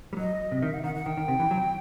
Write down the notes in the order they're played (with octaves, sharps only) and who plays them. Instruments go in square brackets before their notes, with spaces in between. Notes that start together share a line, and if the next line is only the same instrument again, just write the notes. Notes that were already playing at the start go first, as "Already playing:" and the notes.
[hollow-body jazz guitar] G3
[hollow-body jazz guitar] F#3 [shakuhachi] D#5
[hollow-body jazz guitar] C3
[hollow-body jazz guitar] D#3 [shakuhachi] E5
[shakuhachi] F#5
[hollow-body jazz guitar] D#3 [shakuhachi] F#5
[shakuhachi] F#5
[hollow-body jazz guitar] D#3 [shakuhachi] G5
[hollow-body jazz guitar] D#3
C3
E3
F#3